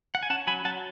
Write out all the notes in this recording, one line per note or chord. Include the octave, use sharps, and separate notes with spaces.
F#5
G#5
C#4 F#5 A5
F#3 G#5 B5
F#3 F#5 A5